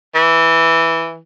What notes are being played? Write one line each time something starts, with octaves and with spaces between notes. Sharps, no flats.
E3